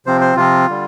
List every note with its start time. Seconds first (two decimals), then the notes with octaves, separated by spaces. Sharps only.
0.06 C3 F3 C4 C5
0.21 C5
0.36 C3 F3 C4 F4
0.69 D3 G3